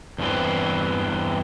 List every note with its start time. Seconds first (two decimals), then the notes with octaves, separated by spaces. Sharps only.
0.18 E2 G2 E3 C4